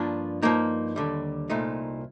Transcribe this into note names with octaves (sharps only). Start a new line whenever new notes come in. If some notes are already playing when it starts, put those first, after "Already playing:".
Already playing: G2 F3 A#3 D4 F4
G2 F3 A#3 D#4
D#2 D3 G3
C2 A#2 A3 D#4